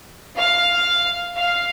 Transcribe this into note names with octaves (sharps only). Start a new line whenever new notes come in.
F5
F5